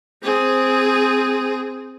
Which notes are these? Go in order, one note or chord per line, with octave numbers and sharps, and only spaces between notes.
C4 G#4